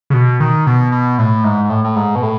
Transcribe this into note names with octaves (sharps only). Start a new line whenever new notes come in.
C#3
B2
D#3
B2
B2
A2
G#2
G#2
A2
A2
G#2
B2
A2